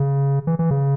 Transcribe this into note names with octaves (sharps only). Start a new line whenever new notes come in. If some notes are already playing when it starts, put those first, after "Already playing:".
Already playing: C#3
E3
E3
C#3